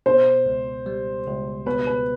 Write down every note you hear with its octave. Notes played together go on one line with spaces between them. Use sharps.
B2 C5
C#2
G3
C#2
B2 B4
B4